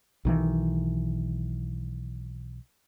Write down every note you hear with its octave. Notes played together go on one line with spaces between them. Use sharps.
B1 D#3 E3